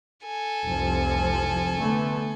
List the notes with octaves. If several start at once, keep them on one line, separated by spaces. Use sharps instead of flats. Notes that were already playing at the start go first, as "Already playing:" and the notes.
A4 G#5
F1 C2 F3
D3 A3 B3